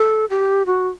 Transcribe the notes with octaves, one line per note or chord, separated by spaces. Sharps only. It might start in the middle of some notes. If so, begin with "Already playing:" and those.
Already playing: A4
G4
F#4